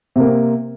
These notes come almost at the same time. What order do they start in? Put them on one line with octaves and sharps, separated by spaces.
C3 A#3 C4